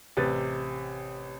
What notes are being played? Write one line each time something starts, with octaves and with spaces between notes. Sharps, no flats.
A1 C3 B4 A6